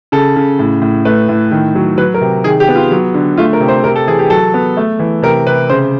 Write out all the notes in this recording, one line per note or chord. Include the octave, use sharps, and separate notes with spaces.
C#3 A4
C#3
A2
A2
A3 B4
A2
D#3
F#3
F#3 B4
A#4
C3
D#3 G#4
G4
B3
F4
F#3
D3
A3 F4
A#4
C3
C5
C3 A#4
A4
E3 G#4
G4
F#3 A4
B3
A3
E3
C3 A#4
C3 B4
C#3 C5